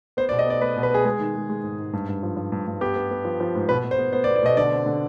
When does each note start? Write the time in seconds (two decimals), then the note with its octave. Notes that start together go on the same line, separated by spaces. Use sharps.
0.17 B3 C5
0.29 D5
0.31 B2
0.39 D#5
0.46 B3 D5
0.61 B3 B4
0.77 B2
0.83 B4
0.90 B3 G#4
1.05 G#3 G#4
1.20 D#3
1.35 G#3
1.49 G#3
1.63 G#2
1.79 G#2
1.93 G2
2.09 G2
2.23 F3
2.37 F3
2.52 G2
2.67 G2
2.81 B3 G4
2.96 B3
3.11 B3
3.25 F3
3.40 F3
3.55 G#2
3.69 B2 B4
3.84 B2
3.91 C5
3.99 B3
4.13 B3 C5
4.24 D5
4.28 B3
4.36 D5
4.43 B2 D#5
4.57 D3 D5
4.72 C4
4.86 D3